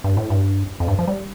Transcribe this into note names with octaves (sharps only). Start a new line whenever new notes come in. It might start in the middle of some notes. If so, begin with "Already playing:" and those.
G2
A2
G2
F2
G2
F3
G3